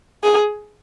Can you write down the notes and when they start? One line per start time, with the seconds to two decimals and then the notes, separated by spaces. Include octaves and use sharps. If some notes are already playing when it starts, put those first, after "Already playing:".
0.24 G#4